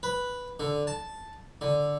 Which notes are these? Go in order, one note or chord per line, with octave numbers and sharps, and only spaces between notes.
B4
D3
A5
D3